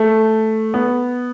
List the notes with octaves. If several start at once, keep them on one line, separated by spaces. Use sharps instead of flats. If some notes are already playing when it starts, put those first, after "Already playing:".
Already playing: A3
B3